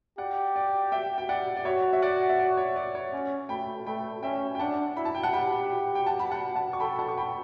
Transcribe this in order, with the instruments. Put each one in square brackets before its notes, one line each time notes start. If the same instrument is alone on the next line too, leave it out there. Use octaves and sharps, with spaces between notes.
[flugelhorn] G4 [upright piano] D5 F#5
[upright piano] D5
E5 G5
G5
D5 F#5
D5
[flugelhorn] F#4 [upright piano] C#5 E5
[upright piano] E5
D5 F#5
E5
D5
C#5
D5
C#5
[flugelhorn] C#4
[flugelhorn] A3 [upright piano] G5 B5
[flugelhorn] A3 [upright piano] G5 B5
[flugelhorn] C#4 [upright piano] E5 G5
[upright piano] G5
[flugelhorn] D4 [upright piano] F#5 A5
[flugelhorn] E4 [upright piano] B5
[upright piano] A5
G5
F#5 A5
[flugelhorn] G4 [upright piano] G5 B5
[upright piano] G5
F#5 A5
B5
F#5 A5
F#5 A5
C#6
[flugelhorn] A4 [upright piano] G5 B5
[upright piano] F#5 A5
C#6
G5 B5